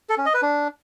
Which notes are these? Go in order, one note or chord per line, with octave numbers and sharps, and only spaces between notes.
A4
C#4
D#5
B4
D4